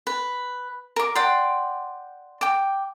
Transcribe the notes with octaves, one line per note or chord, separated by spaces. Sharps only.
B4
A#4 D6
D5 F#5 G5 C6
G5 D6